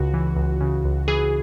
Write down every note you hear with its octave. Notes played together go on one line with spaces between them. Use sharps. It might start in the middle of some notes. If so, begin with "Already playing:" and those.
Already playing: C#2 C#3 F#4
E3
C#2
C#3
C#2
E3 G#4